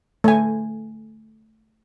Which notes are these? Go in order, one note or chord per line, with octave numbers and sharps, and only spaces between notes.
A3 G#5